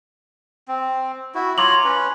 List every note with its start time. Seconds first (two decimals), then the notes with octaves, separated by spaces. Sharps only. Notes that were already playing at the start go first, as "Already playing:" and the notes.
0.68 C4
1.35 E4 F#4
1.58 F4 C#5 A#5 C6 D6 F#7
1.84 C#4 B4